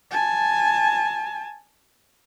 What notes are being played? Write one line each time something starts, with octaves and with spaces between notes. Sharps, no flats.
G#5 A5